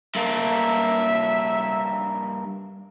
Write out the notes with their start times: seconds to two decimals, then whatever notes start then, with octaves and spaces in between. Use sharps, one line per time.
0.15 G2 A#3 E5